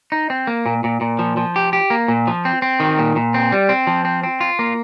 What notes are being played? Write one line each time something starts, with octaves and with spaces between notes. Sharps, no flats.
D#4
C4
A#3
A#2
A#2
A#2
F3
F3
G4
G4
A#3
A#2
F3
C4
C4
D#3
A#2
A#2
C4
G3
C4
F3
C4
C4
F4
A#3